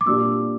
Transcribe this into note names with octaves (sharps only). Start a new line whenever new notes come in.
D6
A#2 G3 D4 G4 E6